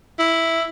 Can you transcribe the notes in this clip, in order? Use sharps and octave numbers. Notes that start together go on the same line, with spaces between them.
E4